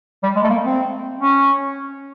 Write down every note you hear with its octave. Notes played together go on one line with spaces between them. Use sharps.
G3
G#3
A3
A#3
C4
C#4